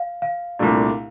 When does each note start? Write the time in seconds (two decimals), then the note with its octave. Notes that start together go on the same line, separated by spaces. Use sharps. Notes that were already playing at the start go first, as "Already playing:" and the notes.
Already playing: F5
0.22 F5
0.59 C2 A#2 A3 D4